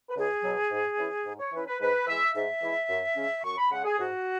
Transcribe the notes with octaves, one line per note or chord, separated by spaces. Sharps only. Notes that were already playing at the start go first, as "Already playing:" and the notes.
B4
C#2 G#4
B2 F#3
G#2
E3 C#4 E4
G#2
C#5
E3 C#4 E4 B4
B4
G#2 B4
E3 G#3 E4 E5
G#2 E5
E3 G#3 E4
F#2
C#3 G#3 C#4
F#2 C#6
B5
C#3 G#3 C#4 F#5
G#4
G#2 F#4